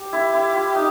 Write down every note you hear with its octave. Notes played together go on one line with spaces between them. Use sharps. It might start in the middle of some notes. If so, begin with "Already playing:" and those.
Already playing: G4
E4
E4
F4
D#4